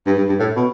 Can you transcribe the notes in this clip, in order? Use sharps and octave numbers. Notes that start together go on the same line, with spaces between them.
G2
G2
G2
A2
B2